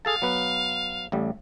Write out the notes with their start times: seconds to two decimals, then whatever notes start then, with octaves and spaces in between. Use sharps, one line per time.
0.05 G#4 A4 F5 A5
0.22 F#3 B3 B4
1.12 A1 A2 G3